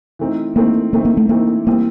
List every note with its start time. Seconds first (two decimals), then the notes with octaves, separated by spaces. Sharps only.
0.19 E3 A3 C4 D#4
0.56 E3 A3 A#3 C4 D#4
0.93 E3 A3 A#3 C4 D#4
1.05 A#3
1.17 A3
1.29 E3 A3 A#3 C4 D#4
1.67 E3 G3 A#3 C4